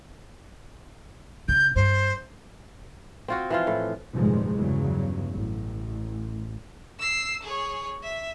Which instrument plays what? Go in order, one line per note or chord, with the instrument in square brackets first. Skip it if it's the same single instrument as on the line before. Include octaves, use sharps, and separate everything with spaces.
[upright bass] C#3 [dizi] G6
[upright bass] G2 [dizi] C5
[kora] C4 F4 F#4
E3 F3 F4
A2
[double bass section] F1 G2 A#2 D#3 F3 G#3
E2 G2 C#3 F#3
A1
[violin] E6 C7
G#4 C#5
E5